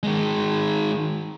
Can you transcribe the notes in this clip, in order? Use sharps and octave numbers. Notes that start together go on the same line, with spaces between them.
D#3 G#3